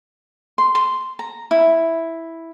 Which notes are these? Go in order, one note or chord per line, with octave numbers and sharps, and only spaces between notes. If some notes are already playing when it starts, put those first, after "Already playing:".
C6
C6
A#5
E4